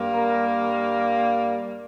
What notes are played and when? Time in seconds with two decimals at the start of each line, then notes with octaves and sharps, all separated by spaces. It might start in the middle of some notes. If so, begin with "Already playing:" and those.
Already playing: G2 G3 A#3
0.14 A#4